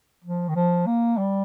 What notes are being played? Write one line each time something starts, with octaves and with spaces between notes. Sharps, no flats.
F3
D#3
F3
A#3
G3